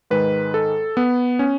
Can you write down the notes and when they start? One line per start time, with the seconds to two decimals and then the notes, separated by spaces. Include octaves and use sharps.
0.11 G#2 D#3 G#3 B4
0.54 A4
0.97 B3
1.39 C#4